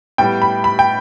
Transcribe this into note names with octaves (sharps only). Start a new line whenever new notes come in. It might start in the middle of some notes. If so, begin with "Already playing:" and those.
A2 G3 B3 G5
B5
B5
G5